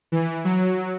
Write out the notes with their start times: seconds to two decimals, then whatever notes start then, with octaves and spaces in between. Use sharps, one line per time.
0.12 E3
0.44 F#3